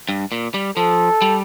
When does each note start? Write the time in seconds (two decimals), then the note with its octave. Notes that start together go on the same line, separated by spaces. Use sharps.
0.09 G2
0.32 A#2
0.54 G3
0.77 F3 A4
1.22 G3